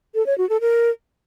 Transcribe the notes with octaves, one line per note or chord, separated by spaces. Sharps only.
A4
C#5
F#4
A4
A#4